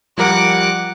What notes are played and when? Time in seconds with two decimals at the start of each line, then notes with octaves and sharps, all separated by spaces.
0.18 F3 G3 A#4 F#5 D6